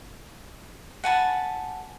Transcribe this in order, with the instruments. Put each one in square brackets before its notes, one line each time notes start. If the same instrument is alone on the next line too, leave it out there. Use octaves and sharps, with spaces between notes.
[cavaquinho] F#5 G#5 A5 B5